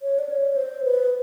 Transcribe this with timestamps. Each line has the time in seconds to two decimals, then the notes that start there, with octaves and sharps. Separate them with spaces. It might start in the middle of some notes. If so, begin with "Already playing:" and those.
0.02 C#5
0.19 D5
0.29 C#5
0.56 C5
0.84 B4